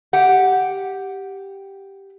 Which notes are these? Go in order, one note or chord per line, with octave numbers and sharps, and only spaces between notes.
G4 F#5